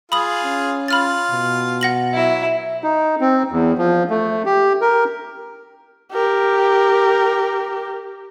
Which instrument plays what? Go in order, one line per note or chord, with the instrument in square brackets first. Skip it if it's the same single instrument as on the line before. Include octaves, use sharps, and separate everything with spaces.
[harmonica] F4 G#4 [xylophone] B5 D#6 F#7
[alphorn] C#4
[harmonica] F4 [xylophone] B5 F6 A6
[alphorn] B2
[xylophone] F#5 A#6 F#7
[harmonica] F#3 [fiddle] E4
[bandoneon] D#4
C4
E2
F3
A3
G4
A#4
[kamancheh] G4 A#4